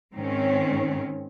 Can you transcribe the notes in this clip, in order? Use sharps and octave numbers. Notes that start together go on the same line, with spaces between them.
G#2 D#3 C4 C#4